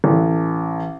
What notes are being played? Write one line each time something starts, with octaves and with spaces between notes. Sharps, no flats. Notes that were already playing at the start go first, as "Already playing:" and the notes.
A1